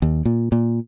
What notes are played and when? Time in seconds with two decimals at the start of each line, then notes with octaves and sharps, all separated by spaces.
0.02 D#2
0.25 A#2
0.52 A#2